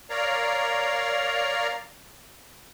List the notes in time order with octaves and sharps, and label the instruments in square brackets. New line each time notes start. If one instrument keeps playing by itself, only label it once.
[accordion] A#4 C#5 D5 F5 A#5